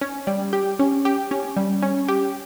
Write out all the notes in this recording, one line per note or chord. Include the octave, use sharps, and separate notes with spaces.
C#4
G3
G4
C#4
G4
C#4
G3
C#4
G4